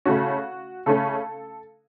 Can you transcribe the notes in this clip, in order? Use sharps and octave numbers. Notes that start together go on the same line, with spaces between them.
C#3 A3 C#4 F#4
C#3 A3 C#4 A4